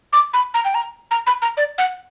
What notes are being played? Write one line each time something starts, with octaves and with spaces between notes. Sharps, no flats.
D6
B5
A#5
G5
A#5
A#5
B5
A#5
D5
F#5